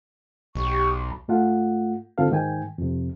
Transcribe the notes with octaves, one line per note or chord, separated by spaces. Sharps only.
B1 G4 C#6
G#2 A3 F4 F#5
G#2 D3 C4 F4 A4 F5
G#2 D#3 G5 G#5
F2 C3